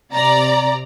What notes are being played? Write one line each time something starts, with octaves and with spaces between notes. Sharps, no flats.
C3 D5 A#5